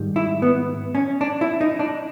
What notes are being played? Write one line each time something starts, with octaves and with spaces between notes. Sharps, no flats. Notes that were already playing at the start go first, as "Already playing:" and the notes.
Already playing: G#2 D#3 G3
E4
B3
C#4
D4
E4
D#4
D4